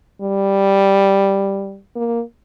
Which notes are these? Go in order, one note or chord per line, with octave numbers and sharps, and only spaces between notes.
G3
A#3